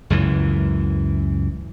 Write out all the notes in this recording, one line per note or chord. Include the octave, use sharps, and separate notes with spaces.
C#2 F#2 E3